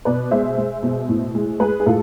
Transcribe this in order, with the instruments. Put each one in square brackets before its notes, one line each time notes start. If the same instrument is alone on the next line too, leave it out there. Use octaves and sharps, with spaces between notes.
[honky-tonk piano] B2 B4 D5
G#3 C5 E5
G#3
B2
A2
G#3
G#3 G#4 B4
G#4
A2 F4 A4